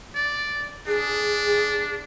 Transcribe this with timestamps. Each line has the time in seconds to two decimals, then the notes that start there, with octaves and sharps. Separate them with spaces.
0.15 D5
0.87 D4 G#4